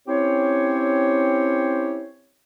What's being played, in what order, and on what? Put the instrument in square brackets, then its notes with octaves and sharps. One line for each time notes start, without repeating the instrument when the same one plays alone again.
[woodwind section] C4 C#4 E4 G4 C5 C#5